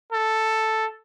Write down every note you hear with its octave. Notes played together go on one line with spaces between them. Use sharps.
A4